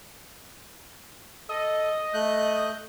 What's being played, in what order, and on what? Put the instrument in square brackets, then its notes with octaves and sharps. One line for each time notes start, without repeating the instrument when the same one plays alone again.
[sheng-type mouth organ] A4 [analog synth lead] D#5
[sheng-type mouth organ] A3 F#6 G6